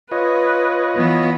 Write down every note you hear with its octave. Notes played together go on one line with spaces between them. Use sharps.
F4 B4 C#5 D#5
E3 B3